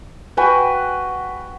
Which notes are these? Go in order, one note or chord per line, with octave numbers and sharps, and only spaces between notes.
F#4 B4 G5 G#5